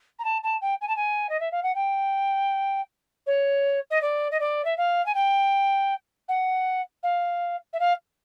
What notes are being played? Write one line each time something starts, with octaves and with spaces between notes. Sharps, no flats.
A#5
A5
A5
G5
G#5
A5
G#5
D#5
E5
F5
F#5
G5
C#5
D#5
D5
D#5
D5
E5
F5
G#5
G5
F#5
F5
E5
F5